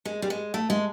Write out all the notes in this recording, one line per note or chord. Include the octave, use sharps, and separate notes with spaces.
G#3
G3
G#3
A3
G#3